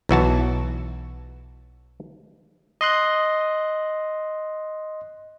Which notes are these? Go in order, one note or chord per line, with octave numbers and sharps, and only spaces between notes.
B1 E3 F#4 A5
D#5 C6 F#6